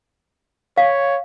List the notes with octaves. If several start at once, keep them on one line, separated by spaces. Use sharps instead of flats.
C#5 F5